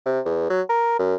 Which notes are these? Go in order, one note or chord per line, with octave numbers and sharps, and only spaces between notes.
C3
E2
F#3
A#4
F#2